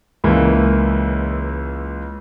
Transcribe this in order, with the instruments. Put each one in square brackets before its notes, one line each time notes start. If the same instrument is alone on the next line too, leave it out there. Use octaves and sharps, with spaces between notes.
[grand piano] C#2 E3 A#3